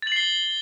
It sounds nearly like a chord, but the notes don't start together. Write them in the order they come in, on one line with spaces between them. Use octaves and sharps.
A6 F#7 C7 G7